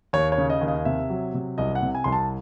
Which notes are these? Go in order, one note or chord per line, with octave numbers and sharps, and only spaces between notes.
D#2 C#5
C#5
C#3
D#5
D#2
D#5
C3 E5
F#3
C3
C2 D#5
F#5
C3
G#5
C2 C6
A5